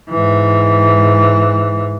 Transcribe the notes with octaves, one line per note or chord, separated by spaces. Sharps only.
G#2 E3